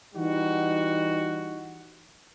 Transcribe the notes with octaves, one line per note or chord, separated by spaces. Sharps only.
E3 G3 D#4 F#4